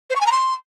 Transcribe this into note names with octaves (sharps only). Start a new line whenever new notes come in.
C5
C#6
G#5
A#5
C6